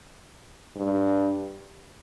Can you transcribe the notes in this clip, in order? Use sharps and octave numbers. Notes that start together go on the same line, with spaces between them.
G2